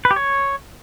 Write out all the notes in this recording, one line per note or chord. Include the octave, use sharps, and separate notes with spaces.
B4
G4
C#5